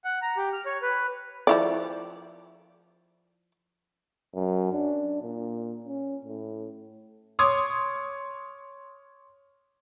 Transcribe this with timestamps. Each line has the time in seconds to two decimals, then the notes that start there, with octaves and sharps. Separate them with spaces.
0.04 F#5
0.22 A#5
0.37 G4
0.53 F6
0.66 C#5
0.82 B4
1.47 F3 E4 D5
4.35 F#2
4.72 D4
5.22 A#2
5.85 C#4
6.25 A2
7.39 C#5 C6 D6 D#6 G#6